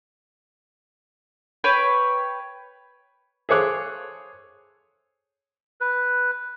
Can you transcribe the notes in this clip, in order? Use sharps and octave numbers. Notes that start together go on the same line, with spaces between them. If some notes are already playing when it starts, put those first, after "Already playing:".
B4 C#5 G5
G#4 A4 C5 C#5 D6 F#6
B4